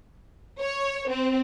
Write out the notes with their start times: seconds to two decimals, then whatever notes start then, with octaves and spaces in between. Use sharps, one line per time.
0.60 C#5
1.09 C4